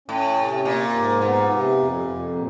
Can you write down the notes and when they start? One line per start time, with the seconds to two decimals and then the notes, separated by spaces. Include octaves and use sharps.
0.08 A2 C#4
0.37 C3
0.65 A#2 A#3
0.93 G#2
1.22 A#2 B3
1.49 C3
1.78 F2
2.06 F2
2.34 A#2